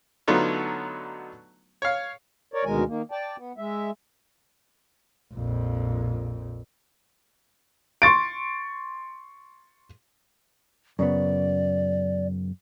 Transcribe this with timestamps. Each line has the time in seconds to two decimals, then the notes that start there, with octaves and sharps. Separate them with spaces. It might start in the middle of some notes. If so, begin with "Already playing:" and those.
0.28 D3 F#3 A3 B3 D#4 F4
1.82 C#5 F5
2.54 A#4 C#5 D5
2.65 D2 B2 D#3 G#3 A#4 G#5
2.88 D#3 A#3
3.11 D5 G5 A5
3.37 B3
3.58 G#3 E5
5.34 A#1 F2
8.02 C6 C#6 A6 D7
10.99 F#2 C#3 B3 D5